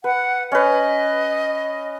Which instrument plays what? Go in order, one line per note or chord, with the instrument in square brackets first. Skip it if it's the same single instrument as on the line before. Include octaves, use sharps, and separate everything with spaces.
[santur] B4 [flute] F#5
[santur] C#4 B4 [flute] D#5